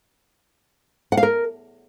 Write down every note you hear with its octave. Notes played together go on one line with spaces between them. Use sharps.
F#5
F5
A#4